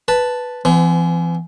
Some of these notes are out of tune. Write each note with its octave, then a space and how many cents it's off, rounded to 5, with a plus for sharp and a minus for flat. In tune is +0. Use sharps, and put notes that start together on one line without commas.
B4 +0 A5 +0
E3 +40 C4 -40